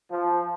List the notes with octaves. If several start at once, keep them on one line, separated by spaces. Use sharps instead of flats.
F3